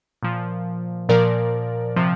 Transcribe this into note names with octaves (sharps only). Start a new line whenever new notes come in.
A#2 F3
A#2 F3 A#4 D5
C3 F3